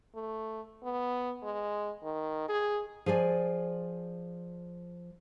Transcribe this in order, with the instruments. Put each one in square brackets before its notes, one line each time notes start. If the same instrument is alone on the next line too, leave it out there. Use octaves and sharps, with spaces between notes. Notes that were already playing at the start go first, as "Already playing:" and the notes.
[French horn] A3
B3
G#3
D#3
G#4
[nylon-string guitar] F3 G#4 D5 G#5